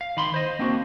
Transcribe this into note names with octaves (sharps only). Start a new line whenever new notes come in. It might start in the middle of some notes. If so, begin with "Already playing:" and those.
F5
D#3 B5 C6
C5 D#5
A#3 C4 D4 F#4